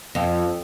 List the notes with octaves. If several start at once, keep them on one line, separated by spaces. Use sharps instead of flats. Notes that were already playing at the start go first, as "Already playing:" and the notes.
F2